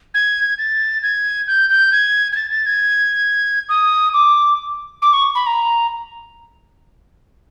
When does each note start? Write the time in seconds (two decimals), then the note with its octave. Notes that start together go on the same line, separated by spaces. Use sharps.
0.14 G#6
0.58 A6
1.03 G#6
1.48 G6
1.70 G6
1.92 G#6
2.32 G#6
2.36 A6
2.51 A6
2.66 G#6
3.69 D#6
4.14 D6
5.02 D6
5.13 C#6
5.35 B5
5.47 A#5